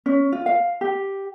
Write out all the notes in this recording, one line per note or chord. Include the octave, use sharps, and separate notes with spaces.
C#4
F4
F5
G4